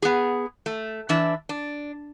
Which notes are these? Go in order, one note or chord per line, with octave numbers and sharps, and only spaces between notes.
B3 G#4
A3
E3 D4 E5
D4